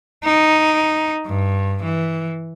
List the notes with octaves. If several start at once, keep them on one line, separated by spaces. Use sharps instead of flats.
D#4
G2
E3